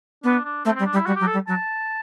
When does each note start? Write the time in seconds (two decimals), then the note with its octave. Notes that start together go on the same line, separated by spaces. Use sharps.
0.24 B3 D4
0.45 D4
0.65 A3 C4
0.75 G3 C4
0.86 D4
0.93 G3
0.96 E4
1.06 G3 F#4
1.16 F#3 G4
1.27 A4
1.33 G3
1.47 F#3 A5